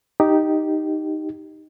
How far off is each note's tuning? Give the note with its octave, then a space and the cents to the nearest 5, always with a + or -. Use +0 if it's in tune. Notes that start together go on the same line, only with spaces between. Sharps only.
D#4 +0 G4 -5